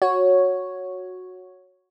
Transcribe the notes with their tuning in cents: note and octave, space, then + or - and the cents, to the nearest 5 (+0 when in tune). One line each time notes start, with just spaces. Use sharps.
F#4 -10 C#5 +0